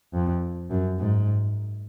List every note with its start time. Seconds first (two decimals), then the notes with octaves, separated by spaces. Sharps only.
0.14 F2
0.70 F#2
0.99 G#2